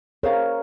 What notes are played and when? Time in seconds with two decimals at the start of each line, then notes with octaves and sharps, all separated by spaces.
0.23 G#4 A#4 C5 C#5 F5 A#5